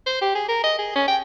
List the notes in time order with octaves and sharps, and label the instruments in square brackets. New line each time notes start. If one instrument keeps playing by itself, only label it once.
[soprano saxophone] C5
G4
G#4
A#4
D#5
G#4
C#4
G5